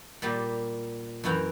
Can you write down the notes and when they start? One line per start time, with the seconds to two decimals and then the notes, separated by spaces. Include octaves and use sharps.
0.22 A#2 G3 G4
1.24 F#2 E3 E4 G5 A#5